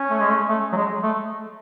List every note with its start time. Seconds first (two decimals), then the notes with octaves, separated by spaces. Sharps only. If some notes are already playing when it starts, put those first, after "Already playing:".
Already playing: C#4
0.10 A3
0.20 G#3
0.29 A3
0.49 A3
0.72 F#3
0.76 G#3
1.03 A3